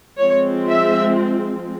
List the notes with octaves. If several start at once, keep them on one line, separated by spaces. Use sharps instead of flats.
F3 G#3 C4 C#5
E5